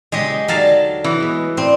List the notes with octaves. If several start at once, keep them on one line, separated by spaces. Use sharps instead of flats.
E2 C#3 F#3 G#3 G4 D#5
D#2 D3 F#3 F5 A5
E3
G#3 B3
A2 C4 D4